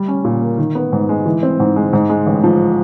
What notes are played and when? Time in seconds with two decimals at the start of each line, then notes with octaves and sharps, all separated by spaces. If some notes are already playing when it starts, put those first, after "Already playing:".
Already playing: G3
0.08 C#4
0.25 A#2
0.42 A#3
0.58 D#3
0.75 B3
0.92 G#2
1.09 G#3
1.26 E3
1.43 C4
1.60 G#2
1.76 G#3
1.93 G#2
2.10 G#3
2.27 A1
2.44 F3